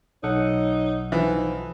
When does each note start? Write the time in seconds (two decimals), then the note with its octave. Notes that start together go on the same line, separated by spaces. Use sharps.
0.23 B1 D#4 A4 C#5 F#5
1.12 E3 F3 D#4